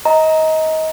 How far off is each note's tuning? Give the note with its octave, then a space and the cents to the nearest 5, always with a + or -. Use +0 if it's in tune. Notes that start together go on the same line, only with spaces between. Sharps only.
D#5 +25 A#5 +0